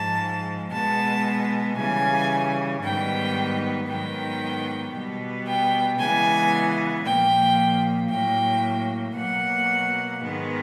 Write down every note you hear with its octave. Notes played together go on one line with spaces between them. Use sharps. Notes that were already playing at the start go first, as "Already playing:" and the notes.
Already playing: G#2 F3 G#3 A5
B2 G#3 B3 A5
C#3 E3 G3 G#5
G#2 D#3 G3 B3 G5
G#2 D#3 F#3 B3 G5
B2 G3 B3
G5
C#3 E3 G#3 B3 G#5
A#2 F3 A#3 G5
A2 F#3 A#3 G5
B2 F#3 A#3 F#5
G#2 D#3 G#3 B3